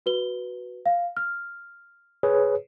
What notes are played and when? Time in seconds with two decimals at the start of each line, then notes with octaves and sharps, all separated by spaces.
0.06 F#4 B4 G7
0.86 F5
1.17 F6
2.23 G#4 B4 C#5